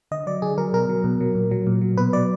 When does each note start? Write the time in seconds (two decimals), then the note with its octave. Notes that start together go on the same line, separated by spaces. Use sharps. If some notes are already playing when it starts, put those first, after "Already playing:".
0.11 D3 D#5
0.26 F#3 D5
0.42 D3 G#4
0.58 F#3 A#4
0.73 B2 A#4
0.89 F#3
1.04 B2
1.21 F#3
1.35 A#2
1.51 F#3
1.67 A#2
1.81 F#3
1.97 B2 B4
2.13 F#3 D5